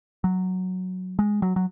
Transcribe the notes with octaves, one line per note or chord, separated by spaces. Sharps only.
F#3
G#3
F#3
F#3